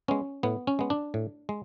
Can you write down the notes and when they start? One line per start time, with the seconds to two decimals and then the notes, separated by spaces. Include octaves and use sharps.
0.08 G#3 B3 C#4
0.43 A2 B3
0.67 C#4
0.79 G#3 B3
0.90 D4
1.14 A2
1.49 G#3